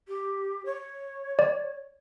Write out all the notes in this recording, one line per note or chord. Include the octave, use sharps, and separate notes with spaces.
G4
C#5
D5